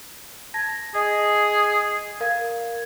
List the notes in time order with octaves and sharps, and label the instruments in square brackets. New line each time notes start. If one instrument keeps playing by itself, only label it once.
[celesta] A5 G#6 A#6
[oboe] G#4 [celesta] D#5
[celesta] A#4 F5 G#6